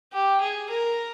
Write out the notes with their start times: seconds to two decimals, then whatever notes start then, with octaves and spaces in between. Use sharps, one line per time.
0.13 G4
0.41 G#4
0.69 A#4